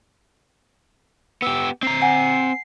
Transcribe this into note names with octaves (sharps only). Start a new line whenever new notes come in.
B3 G4 E6
C4 A#5 C7
F#5 G#5